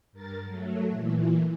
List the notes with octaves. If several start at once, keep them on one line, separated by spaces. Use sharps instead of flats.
G2 A#4 A6
F#3 A3
A#2 E3